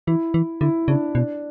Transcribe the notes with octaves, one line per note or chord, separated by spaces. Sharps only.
E3 E4
E3
D3 E4
C#3 D4
B2 D4